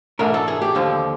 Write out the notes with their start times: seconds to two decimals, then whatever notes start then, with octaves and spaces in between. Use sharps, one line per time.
0.19 G#2 E3 A3 D4 A#4
0.34 A4
0.48 G#4
0.62 G4
0.75 D#2 D3 F3